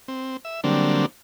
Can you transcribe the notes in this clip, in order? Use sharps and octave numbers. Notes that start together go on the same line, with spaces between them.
C4
E5
D3 F#3 G3 A#3 C4 D4